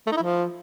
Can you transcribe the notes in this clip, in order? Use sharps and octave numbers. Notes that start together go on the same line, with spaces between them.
A3
D#4
E4
F3